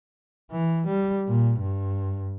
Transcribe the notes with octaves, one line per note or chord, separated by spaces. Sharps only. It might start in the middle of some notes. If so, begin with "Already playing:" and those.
E3
G3
A#2
G2